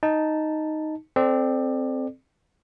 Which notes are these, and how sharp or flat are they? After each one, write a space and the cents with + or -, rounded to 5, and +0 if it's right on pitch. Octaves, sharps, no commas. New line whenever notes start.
D#4 +0 A5 +0
C4 +0 A4 -15 D5 +20